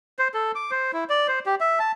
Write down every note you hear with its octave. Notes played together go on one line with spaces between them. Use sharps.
C5
A4
D6
C5
E4
D5
C5
G4
E5
A5